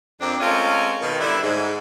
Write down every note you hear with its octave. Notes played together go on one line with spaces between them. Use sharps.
F2 A#3 C4 D4 G4 D5
G#3 A3 C4 C#4 F4 A#4
B2 D#3
D3 G3 D4 E4
G#2